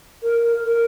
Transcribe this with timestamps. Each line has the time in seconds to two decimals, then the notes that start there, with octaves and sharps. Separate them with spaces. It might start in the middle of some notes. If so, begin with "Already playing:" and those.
0.23 A#4
0.67 A#4